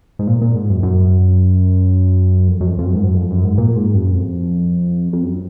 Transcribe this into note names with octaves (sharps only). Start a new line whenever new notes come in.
G#2
A#2
A#2
G#2
F#2
F#2
F2
F#2
F2
F2
F#2
G#2
F#2
F2
F#2
G#2
A#2
G#2
F#2
F2
F2
F#2